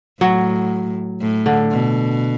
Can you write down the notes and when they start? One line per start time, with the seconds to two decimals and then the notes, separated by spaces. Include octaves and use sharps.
0.21 A2 F#3
1.22 A2
1.46 D3
1.71 B2